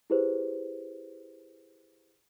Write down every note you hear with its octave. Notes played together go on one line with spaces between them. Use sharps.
E4 G4 G#4 B4 C5